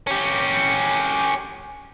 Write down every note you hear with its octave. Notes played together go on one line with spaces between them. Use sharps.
C#4 G4